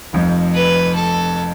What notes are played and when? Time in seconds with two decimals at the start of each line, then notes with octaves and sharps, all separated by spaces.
0.13 F1 F2 F3
0.54 B4
0.95 A4